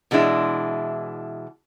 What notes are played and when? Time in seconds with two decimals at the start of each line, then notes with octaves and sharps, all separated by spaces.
0.11 B2 E3 G#3 D4 E4